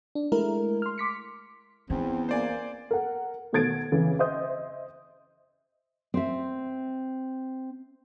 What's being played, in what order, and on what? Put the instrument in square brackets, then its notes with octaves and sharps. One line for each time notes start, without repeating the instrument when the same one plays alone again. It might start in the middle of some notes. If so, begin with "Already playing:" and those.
[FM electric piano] D4
G#3 A3 E4 A#4
C6 F6
C6 D6 B6 C#7
[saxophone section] E2 [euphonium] C4 [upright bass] C#4
[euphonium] A#3 [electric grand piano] C5 D5 G#5
[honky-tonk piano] A#4 F#5
B2 D#3 A3 G#6 A6 D7
F2 C#3 E3
C5 D#5 E5 C6 D#6 G6
[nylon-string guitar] C4 E5